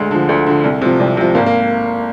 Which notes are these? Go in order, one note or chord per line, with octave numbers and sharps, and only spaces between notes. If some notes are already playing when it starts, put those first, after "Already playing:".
Already playing: D2 G#3
D3 F3
D2
D3 F3
C2
C3 F3
C2
C3 F3
G#1 A#3
A#3